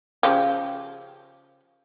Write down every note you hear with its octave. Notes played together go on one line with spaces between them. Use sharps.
C#3 F3 G4